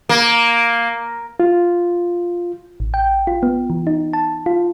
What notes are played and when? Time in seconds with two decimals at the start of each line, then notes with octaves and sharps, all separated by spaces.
0.09 A#3
1.40 F4
2.80 A1
2.94 G5
3.27 F4
3.43 B3
3.70 E3
3.87 D#4
4.13 A5
4.46 F4